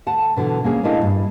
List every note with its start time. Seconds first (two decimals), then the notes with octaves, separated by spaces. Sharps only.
0.06 D2 F#5 A5
0.36 B2 D3 E3
0.64 A#3 C#4 G#4
0.83 A#2 A3 D4 E4 D#5 F5
1.02 G2